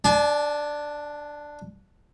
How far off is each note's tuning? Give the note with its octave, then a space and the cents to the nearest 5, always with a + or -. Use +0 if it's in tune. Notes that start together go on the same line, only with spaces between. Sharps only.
D4 +5 A5 -45